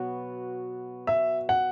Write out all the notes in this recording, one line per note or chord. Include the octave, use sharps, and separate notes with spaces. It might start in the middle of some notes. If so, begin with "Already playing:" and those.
Already playing: B2 F#3 B3 F#4
E5
F#5